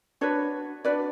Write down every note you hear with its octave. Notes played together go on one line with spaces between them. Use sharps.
D4 F#4 B4 C#5
D4 F#4 B4 D5